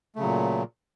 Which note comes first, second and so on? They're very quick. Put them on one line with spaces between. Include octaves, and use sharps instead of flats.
A3 C#3 F#3 A#2